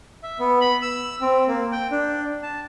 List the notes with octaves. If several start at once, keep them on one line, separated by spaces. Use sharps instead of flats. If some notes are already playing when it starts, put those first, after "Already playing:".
E5
B3
B5
E6
C4
A#3
G5
D4
A5